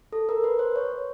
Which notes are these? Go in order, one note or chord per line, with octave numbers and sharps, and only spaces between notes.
A4
A#4
B4
C5
C#5